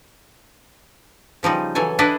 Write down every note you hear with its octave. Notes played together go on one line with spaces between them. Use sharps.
C#3 F3 G3 D#4
E3 F#3 A4 G#5
D4 E4 B4 D#5